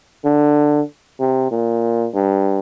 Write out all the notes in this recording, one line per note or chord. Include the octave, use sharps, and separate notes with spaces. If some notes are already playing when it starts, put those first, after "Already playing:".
D3
C3
A#2
G2